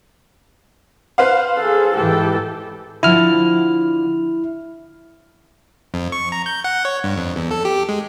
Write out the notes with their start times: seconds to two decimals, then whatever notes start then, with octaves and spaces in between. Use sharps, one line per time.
1.18 B4 C5 F5
1.58 G#4 A4
1.94 G#2 E3 G4 A4
3.03 D3 F3 E4 F6
5.94 F2
6.12 C#6
6.32 A#5
6.46 G6
6.64 F#5
6.85 C#5
7.04 G2
7.17 F2
7.36 E2
7.51 A4
7.65 G4
7.89 G#3